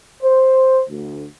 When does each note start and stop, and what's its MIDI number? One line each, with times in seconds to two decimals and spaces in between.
0.22 0.81 72
0.89 1.23 38